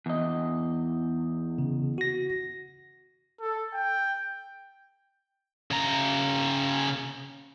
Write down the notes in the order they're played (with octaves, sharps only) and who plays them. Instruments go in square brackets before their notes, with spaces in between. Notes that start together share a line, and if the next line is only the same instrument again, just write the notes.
[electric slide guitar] E2 D#5
[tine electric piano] C#3
F#4 A#6
[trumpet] A4
G5
[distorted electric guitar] C#3 A#5